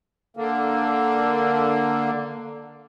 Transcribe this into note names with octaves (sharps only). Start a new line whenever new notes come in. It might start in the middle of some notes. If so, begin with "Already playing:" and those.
D3 A#3